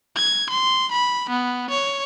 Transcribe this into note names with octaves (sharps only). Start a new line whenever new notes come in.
G#6
C6
B5
B3
C#5